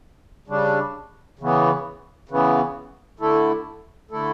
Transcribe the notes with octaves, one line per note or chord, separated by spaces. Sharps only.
C#3 G3 D4
C#3 E3 B3
C#3 E3 B3
D3 A3 E4 A4
D3 A3 E4 A4